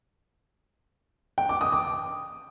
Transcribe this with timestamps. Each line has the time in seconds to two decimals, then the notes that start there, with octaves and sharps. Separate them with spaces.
1.38 G5
1.49 D6
1.61 D#6
1.72 D6